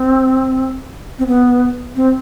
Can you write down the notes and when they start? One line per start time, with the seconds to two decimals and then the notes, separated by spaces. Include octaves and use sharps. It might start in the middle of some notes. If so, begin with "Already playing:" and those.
Already playing: C4
1.19 C4
1.27 B3
1.96 C4